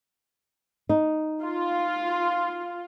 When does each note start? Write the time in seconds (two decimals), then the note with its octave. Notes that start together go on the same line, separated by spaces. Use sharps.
0.89 D#4
1.42 F4